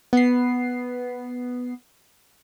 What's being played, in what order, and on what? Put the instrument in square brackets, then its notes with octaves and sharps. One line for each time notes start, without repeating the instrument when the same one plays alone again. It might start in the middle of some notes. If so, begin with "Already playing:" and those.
[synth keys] B3 C7